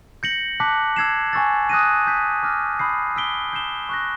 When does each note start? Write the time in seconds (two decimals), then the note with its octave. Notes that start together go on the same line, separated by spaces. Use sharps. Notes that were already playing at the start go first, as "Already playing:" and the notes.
0.23 G6 A#6 C#7 F#7
0.60 A5 D6 F#6 B6
0.96 E6 G#6 C7 E7
1.33 G#5 C#6 E6 A6
1.70 D#6 F#6 A#6 D#7
2.06 D6 G6 B6
2.43 D6 F6 A#6
2.79 B5 D#6 G6 C7
3.16 E6 G6 B6 D7 G7
3.53 G6 C7 E7 G7
3.89 C#6 F#6 A#6